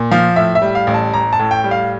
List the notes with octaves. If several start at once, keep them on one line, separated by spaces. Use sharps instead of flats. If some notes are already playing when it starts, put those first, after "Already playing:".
Already playing: A#2
F3 F5
A2 E5
E5
G3
F5
A1
A5
A1 A#5
A5
A2
G5
G3
F5